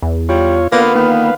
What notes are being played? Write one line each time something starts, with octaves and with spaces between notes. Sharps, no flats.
E2
G3 F4 C#5
D3 A#3 B3 F4 B4 F5
D#3 A#3